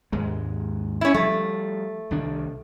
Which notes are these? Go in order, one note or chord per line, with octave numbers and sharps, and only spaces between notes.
D#2 G#2 G#3
C#4 E4
F3 G3 A3
C2 D#3 D4